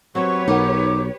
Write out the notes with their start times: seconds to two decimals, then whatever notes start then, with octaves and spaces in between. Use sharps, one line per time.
0.15 F#3 C4 F#4 G4 B4 C#5 C#6
0.48 B1 D#4 A#4 F#5 D6